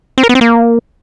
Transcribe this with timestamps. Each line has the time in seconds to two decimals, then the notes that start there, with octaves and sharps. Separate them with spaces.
0.18 C4
0.23 A#4
0.29 B3
0.35 C4
0.41 A#3